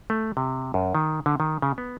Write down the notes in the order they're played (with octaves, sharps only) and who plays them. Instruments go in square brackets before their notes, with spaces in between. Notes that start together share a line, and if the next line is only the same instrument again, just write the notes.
[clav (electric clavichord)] A3
C3
F#2
D#3
D3
D#3
C#3
B3